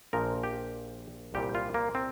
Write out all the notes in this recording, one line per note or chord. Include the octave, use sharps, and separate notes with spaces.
A#1 A#2 F3 A#4
G4
C2 A#2 G3 G4
F4
A#3
C4